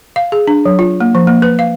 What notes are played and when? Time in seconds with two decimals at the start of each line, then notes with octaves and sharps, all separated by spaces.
0.16 F5
0.32 G#4
0.47 D4
0.65 F#3
0.79 F4
1.01 A#3
1.15 F3
1.27 A#3
1.42 B4
1.59 F5